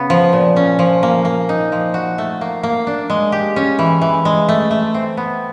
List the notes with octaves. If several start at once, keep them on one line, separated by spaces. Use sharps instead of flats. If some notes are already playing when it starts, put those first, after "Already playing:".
Already playing: C#3 B3
F3
A#2
C#4
F3
A#3
A#3
D#4
F3
F#4
A3
A#3
A#3
D4
G#3
G4
C#4
E3
E3
G#3
A3
A3
C4
B3